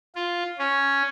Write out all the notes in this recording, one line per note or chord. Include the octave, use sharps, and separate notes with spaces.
F4
C#4